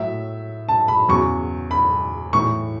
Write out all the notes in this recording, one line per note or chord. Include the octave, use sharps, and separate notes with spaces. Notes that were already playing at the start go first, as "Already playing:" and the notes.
Already playing: A2 F#3 E5
A5
B5
E2 C#3 F#3 C#6
B5
A2 E3 C#6